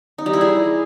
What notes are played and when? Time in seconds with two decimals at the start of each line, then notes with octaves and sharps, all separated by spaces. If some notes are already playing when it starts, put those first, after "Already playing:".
0.18 D#4
0.26 G3
0.33 E4
0.41 G#4